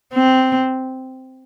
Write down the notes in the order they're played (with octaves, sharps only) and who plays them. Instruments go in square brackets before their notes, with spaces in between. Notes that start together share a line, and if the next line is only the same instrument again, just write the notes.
[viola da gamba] C4